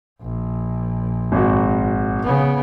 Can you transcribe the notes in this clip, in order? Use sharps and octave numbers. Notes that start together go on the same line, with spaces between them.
A#1
G#1 F#4
C#3 B3